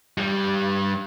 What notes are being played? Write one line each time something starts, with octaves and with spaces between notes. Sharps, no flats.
G2 G3